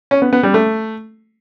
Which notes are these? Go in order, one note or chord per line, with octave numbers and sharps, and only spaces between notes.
C#4
B3
B3
G3
A3